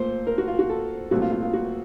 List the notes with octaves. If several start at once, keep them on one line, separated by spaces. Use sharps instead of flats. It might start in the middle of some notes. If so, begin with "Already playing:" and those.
Already playing: A#2 A3 C5
A#4
F#4
F4
F#4
A4
C2 A#2 F#3 A3 F#4
F4
F4
F4
F#4